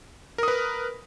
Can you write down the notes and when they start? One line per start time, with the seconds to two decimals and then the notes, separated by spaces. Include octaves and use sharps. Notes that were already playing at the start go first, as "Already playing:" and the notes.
0.38 A#4
0.43 D#6
0.48 B4